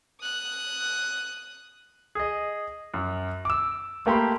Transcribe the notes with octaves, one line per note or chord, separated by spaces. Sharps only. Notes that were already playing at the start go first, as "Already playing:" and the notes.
D#6 F#6
G#4 D#5
F#2
D6 E6
A3 A#3 G4 B5 C6